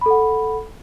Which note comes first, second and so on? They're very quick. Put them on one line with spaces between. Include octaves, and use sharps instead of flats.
B5 A4 F#5